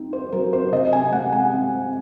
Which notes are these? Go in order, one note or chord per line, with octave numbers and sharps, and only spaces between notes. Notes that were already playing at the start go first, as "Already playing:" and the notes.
Already playing: C4 D#4
C5
F#3 A#4
C5
C3 D#5
G#5
G#3 F#5
G#5
C4